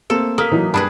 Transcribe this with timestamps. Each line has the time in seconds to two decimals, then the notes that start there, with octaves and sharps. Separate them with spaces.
0.10 A3 A#3 C4 A4
0.38 A#3 A4 D#6 B6
0.52 E3 F#3 D#4
0.74 G2 D4 G#4 B4 B5